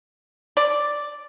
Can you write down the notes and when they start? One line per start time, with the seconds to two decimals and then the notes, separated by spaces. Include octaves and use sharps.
0.57 D5